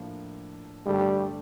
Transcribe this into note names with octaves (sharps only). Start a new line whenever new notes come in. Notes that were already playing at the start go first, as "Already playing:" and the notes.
Already playing: A2 F3 A#3 D4
G2 D3 G3 A3 D4 G4